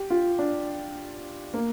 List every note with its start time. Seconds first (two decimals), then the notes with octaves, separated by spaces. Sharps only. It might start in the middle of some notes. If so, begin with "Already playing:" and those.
Already playing: G4
0.10 F4
0.39 D4
1.54 A#3